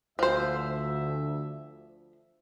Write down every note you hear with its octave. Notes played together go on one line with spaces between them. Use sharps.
D2 F3 C5 E5